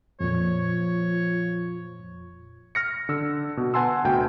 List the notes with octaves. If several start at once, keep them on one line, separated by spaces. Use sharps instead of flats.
F2 A#2 F3 C#5
F6 A#6 C#7
D3 E6
B2
B4 F#5 G#5 A5 C6 E6
D2 B2 G5